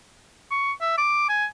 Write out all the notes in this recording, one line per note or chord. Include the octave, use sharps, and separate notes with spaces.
C#6
E5
D6
G#5